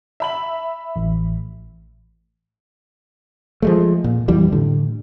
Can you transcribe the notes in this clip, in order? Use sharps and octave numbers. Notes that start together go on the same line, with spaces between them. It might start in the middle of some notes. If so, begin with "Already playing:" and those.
E5 B5 F#7
A1
F3 G#3 A3
A#2
F2 E3 G3
A2 D3